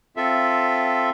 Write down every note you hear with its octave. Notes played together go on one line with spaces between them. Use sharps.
C4 F4 A4 E5